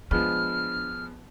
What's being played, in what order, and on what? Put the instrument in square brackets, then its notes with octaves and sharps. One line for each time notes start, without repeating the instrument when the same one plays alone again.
[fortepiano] F3 G#3 B3 [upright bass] D4 [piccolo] F6